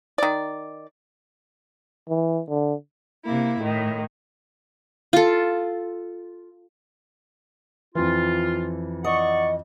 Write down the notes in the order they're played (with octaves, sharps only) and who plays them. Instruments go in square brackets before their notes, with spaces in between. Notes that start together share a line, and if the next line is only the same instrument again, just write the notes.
[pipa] D#3 D5
[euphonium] E3
D3
[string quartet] C3 A#3 E4
A2 D#3
[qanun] F4 A4
[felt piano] F2 E3 [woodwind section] F4
[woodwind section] D5 F#5 C#6 [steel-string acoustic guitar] D#5